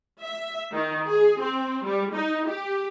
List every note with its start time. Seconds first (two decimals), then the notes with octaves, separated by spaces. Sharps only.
0.23 E5
0.72 D#3
1.08 G#4
1.41 C4
1.84 G3
2.13 D#4
2.46 G4